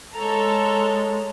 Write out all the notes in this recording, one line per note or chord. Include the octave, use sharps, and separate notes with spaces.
G#3 A4 C#5 A#5